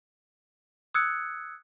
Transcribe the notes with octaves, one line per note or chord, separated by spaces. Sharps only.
D#6 E6 F#6 G#6 C#7